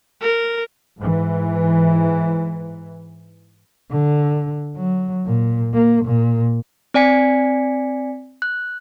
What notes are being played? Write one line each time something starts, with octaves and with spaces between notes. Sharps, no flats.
A#4
G#2 E3
D3
F#3
A#2
A#3
A#2
C4 D5 G#5 B6 C#7
F#6